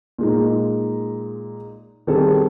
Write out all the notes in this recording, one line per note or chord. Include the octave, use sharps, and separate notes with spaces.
A#2 G#3 D#4
D#3 G3 C4 G#4 A4